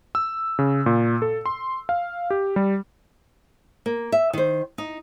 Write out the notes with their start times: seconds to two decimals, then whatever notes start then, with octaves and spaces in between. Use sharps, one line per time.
0.15 E6
0.59 C#3
0.86 A#2
1.22 A4
1.46 C6
1.89 F5
2.30 G4
2.56 G3
3.86 A#3
4.12 E5
4.33 D#3 C5
4.78 D#4